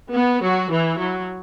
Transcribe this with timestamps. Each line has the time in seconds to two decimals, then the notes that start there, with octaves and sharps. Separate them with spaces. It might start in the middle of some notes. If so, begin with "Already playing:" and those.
0.12 B3
0.41 F#3 F#4
0.69 E3 E4
0.98 F#3